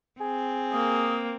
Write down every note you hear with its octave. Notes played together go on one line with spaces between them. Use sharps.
C4 G#4
A#3 D#6